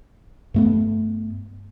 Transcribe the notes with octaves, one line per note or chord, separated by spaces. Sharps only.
G2 A3 B3